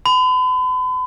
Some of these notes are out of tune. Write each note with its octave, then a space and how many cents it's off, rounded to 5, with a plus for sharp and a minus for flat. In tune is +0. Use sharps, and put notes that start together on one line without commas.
B5 +40